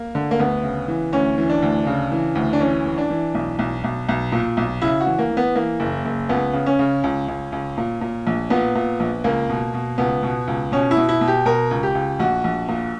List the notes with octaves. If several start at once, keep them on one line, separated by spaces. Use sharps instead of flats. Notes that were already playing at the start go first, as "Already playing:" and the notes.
Already playing: A#3
D3
A#3
D2 B3
C#3
E3
D2 C#4
E3
D4
D2
C#3
E3
D2
D4
E3 C#4
E3
D4
E3
B1
B1
B1
B1
A#2
B1
C#3 E4
F#4
E3
A#3
E3
B3
E3 A#3
F#1
F#1
C#2 B3
C#3
C#4
C#3
C#2
C#2
C#2
A#2
A#2
A#1
A#2 B3
A#2
A#1
C#2 A#3
B2
B2
C#2 B3
B2
C#2
B2 C#4
E4
B2
E4
B2
G4
B2 A#4
C#2
G4
C#2
A#1 F#4
A#1
A#2